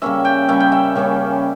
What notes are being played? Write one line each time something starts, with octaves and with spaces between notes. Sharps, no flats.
C#3 G3 A#3 C#4 E5
G5
C#3 G3 A#3 C#4 E5
G5
E5
C#3 G3 A#3 C#4